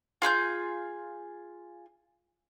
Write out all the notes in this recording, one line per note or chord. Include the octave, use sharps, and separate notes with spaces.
F4 G#4 B5 G6